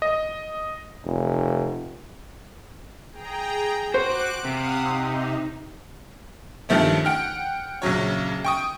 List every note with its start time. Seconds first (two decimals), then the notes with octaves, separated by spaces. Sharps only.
0.02 D#5
1.04 F1
3.11 G#4 G5 A#5
3.94 F#4 C5 D6 F#6 D7
4.45 C3 F5 F#5 D#6
4.83 D#4
6.69 G2 D#3 F3 A3 C#4
7.05 F#5 G5 F6
7.82 A#1 C#3 F#3 C#5
8.45 G5 C#6 D#6